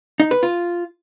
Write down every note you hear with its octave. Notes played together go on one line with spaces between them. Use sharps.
D#4
B4
F4